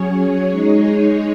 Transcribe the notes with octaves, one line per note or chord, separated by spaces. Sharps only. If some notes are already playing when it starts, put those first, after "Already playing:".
Already playing: F#3 C#4 G#4 C#5
G#3 D#4 G#4 C#5